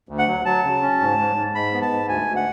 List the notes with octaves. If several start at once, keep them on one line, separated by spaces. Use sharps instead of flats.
D2
F#5
F#3
F#3 A5
C#3
C#4
G#2
G#2
G#2
G#2 B5
B3
A5
G#2
D2 G#5
D2
F#5